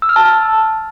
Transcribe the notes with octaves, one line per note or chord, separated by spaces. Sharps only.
E6
F6
A5